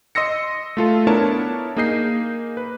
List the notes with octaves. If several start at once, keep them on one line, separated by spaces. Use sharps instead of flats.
D#5 C6 E6 A#6 C#7
A3 F4 A4
B3 D4 E4 A#4 C#5 A5
A#3 D#4 G#4 D#5 G6 C7
B4